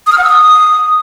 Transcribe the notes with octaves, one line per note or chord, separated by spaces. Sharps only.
D#6
F6
F#5
E6
D#6